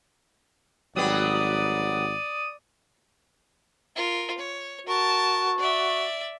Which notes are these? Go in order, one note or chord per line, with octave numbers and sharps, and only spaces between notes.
G#1 F#3 G3 B3 D5 D#6
F4 A#4
C#5
F#4 A#4 A5
D5 E5